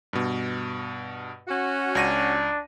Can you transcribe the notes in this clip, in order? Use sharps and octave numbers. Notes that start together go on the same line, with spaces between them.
G2 B2
C#4 F#4
C#2 D4 A#6 D#7